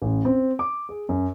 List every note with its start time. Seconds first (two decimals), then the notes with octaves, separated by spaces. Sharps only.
0.02 A1
0.25 C4
0.59 D6
0.89 G#4
1.09 F#2